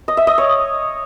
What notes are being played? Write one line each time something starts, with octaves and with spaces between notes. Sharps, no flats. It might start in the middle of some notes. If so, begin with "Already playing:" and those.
D#5
E5
D#5
C#5